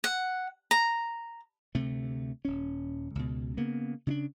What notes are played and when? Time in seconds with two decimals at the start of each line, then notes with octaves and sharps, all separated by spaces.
0.04 F#5
0.71 A#5
1.75 D2 C3 A3
2.45 D#1 C#4
3.15 C#2 B2
3.57 C#3 A#3 B3
4.07 C#3 C#4 D4